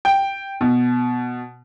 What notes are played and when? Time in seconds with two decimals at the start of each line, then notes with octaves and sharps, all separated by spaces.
0.05 G5
0.61 B2